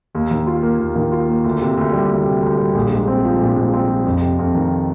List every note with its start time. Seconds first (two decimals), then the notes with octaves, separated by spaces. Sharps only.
0.15 D#2
0.31 D#3
0.47 F4
0.63 A#3
0.79 D#2
0.96 D#3
1.12 F4
1.29 A#3
1.44 D2
1.62 C3
1.77 D2
1.93 G3
2.10 D2
2.26 C3
2.43 D2
2.58 G3
2.75 A#1
2.92 G#2
3.08 C4
3.25 F3
3.41 A#1
3.56 G#2
3.74 C4
3.89 F3
4.06 F2
4.21 C3
4.39 F2
4.55 D#3